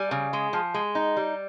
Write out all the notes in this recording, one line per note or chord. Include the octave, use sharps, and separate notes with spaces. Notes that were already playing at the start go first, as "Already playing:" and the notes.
Already playing: G3 G#5
C#3
G#3
F3
G#3
D#4
G3